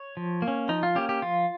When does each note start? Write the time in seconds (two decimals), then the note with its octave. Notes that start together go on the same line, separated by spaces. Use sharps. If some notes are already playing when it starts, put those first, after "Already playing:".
Already playing: C#5
0.17 F3
0.42 A#3
0.48 C#4
0.69 F3 D#4
0.83 F4
0.95 A#3 C#4 G4
1.09 G4
1.22 F3 F4